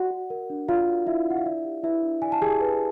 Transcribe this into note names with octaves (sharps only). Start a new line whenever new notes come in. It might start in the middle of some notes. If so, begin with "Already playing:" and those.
Already playing: F#4 D5 F#5
F#4
A#4
D4
F4 D5 F5
F#4
E4 A#4 E5
D4 F#5
F5
E4 D5 E5
G4
E4 B4 E5
D4
D5 G#5
A5
G4 G#4 G#5
B4